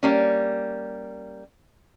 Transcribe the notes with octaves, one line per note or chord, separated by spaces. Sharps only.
G3 A#3 C#4